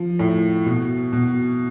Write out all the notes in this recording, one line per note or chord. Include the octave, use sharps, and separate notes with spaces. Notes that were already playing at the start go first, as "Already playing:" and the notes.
Already playing: F3
A2
B2
B2